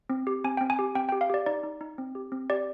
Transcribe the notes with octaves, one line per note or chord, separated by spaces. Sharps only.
C4
G4
C4 G#5
C4 G5
G#5
G4
C4 G5
G4 G5
F5
G4 D5
D#4 D5
D#4
D#4
C4
G4
C4
G4 D5